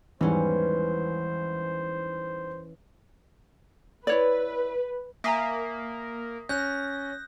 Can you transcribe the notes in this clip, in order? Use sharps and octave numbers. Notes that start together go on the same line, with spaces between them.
E2 G#2 E3 G3 C#4 C5
E4 B4 C#5 D5
A#3 E5 G#5 A#5 D#6 A#6 B6
C#4 F#6 G6 A#6